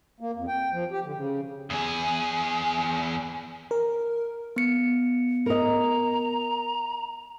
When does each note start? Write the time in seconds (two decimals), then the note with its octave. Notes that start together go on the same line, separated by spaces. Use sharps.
0.20 A#3
0.36 F2
0.48 G5
0.72 F3
0.91 G4
1.04 D3
1.15 C#3
1.70 E2 G#4
3.71 A#4
4.56 B3 C#7
5.46 A#4 D#5 A#5